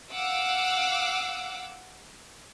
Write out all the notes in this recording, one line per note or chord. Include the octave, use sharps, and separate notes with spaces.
F5 F#5 D6 E6